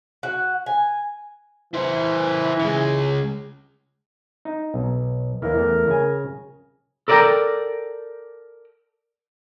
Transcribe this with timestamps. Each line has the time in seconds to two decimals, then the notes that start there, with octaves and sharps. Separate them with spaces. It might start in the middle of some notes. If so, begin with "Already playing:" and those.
0.23 F#4
0.66 G#5
1.74 E3 E4 C5
2.60 C#3 G#3
4.45 D#4
4.74 B1
5.42 D#2 E3 A#4
5.55 E2 A3
5.87 C#3 G#5
7.08 A4 A#4 D5 D#5 G5 A#5